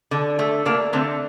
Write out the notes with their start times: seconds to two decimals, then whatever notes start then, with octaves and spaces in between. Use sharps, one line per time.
0.11 D3
0.39 A3
0.65 A3 A#3 D4
0.93 D3 A3 C4